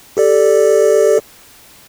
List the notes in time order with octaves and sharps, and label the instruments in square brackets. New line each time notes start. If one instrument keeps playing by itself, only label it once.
[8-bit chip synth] G4 A4 D5